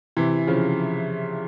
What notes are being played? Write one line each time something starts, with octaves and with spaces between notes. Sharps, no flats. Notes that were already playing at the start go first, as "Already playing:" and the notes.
C3 E3
C#3 F3